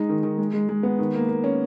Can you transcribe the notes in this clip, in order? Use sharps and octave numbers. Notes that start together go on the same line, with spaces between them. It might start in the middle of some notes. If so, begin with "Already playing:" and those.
Already playing: G#3 D#4
D#3
D#3
G#3
G#3
G#3
B3
D#3
A#3
A#3
C#4